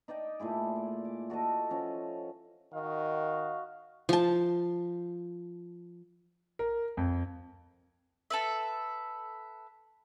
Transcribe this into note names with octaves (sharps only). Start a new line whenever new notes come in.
D#4 D5 D#5 G5
A#2 A3 E4 G#4
D5
D6
F#4 A4 D5 D#5
F3 C#4
D#3 F#4 D#5 F5
F3 A5
A#4
F2
A4 B4 E5